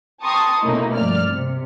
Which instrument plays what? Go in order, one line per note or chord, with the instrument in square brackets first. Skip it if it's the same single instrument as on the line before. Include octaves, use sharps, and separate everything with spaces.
[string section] G5 A5 A#5 C6 C#6 D#6
B2 A3 A#3 C#4 D#4 E4
G2 F3 D5 F6
C3